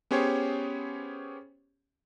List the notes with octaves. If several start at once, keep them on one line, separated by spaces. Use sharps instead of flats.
B3 C#4 G4 G#4 C5 C#5